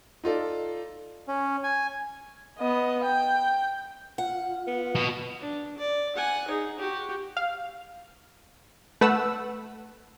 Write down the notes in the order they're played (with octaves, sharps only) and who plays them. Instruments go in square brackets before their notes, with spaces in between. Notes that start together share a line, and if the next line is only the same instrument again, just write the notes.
[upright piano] D#4 F4 A4 D5
[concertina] C#4
G#5
[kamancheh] B3 D#5
G5
[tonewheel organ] F4 [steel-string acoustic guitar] F#5
[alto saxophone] B3
[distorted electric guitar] B2
[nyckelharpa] D4
D5
F#5 G#5
D#4 G#4
F#4 G4
[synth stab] F5
A3 B4 F#5 E6